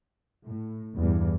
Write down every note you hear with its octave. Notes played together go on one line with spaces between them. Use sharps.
A2
E2 G2